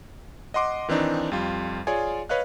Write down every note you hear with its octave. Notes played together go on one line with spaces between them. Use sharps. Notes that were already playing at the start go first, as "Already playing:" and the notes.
D#5 F#5 C6 D6
D#3 E3 C4 D4 D#4
F2 G3 F4
F4 G#4 C#5 D5 G#5
B4 C#5 D#5 F5 F#6